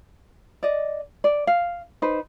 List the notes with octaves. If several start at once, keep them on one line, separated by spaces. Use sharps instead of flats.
D5 D#5
D5
F5
D#4 B4 C5